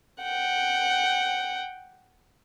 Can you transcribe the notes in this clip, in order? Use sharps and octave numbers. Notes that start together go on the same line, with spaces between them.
F#5 G5